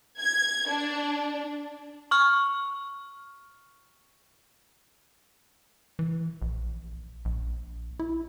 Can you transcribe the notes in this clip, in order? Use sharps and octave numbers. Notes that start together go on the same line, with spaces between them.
G#6
D4
C#6 F6
E3
A#1
A#1
E4